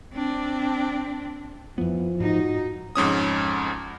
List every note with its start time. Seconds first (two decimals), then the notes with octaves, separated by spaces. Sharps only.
0.13 C4 D4
1.78 F2 E3 F3 B3
2.20 G#2 D#4 F#4
2.95 F2 G#2 C#4 D#6